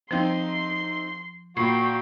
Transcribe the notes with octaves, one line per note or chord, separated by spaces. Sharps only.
F3 C4 D#4 G5 C6
A#2 F#4 G5 B5 C#6 C7